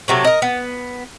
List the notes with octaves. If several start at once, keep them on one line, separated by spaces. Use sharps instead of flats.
C3 F#3 A3
A#4 D#5
B3